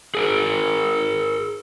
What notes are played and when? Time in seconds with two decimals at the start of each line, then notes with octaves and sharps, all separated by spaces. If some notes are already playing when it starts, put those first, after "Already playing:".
0.15 G#4 A#4